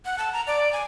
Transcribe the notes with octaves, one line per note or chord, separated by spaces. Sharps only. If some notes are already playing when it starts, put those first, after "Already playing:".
F#5
A5
A#5
D5
G#5